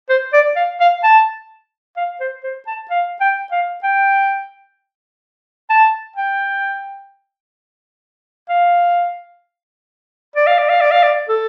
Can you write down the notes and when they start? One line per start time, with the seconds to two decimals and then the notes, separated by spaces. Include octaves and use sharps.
0.09 C5
0.33 D5
0.56 F5
0.80 F5
1.03 A5
1.97 F5
2.20 C5
2.43 C5
2.67 A5
2.90 F5
3.21 G5
3.51 F5
3.83 G5
5.70 A5
6.16 G5
8.49 F5
10.35 D5
10.47 F5
10.58 D5
10.69 F5
10.81 D5
10.91 F5
11.03 D5
11.29 A4